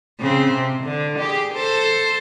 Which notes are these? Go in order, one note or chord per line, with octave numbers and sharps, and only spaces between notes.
C#3 C4
C3
D3
G4 G#4
A4 C5